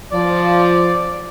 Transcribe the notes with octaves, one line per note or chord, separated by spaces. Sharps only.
F3 D5